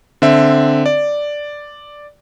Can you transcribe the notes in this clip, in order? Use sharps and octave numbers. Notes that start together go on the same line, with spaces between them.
D3 C4 E5
D5